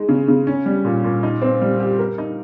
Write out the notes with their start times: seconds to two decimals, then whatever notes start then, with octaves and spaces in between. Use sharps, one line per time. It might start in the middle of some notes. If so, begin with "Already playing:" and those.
Already playing: G#3 D#4
0.09 C#3
0.28 C#3
0.47 C#4
0.66 G3
0.85 A#2
1.04 A#2
1.23 D#4
1.42 C4
1.62 G3
1.80 G4
1.99 A#4
2.18 D#4